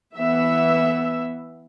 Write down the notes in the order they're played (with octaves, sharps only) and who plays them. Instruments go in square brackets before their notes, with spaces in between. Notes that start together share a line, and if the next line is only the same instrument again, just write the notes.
[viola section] E3 B3 E5